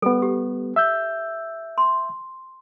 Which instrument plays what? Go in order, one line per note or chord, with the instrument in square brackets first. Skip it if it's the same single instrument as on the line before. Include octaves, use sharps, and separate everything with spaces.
[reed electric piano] G3 B3 [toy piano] A4
[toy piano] G4
[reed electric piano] E5 E6 G6
[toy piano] C6